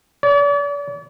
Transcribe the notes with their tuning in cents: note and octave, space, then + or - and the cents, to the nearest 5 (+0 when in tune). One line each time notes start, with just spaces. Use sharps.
D5 -40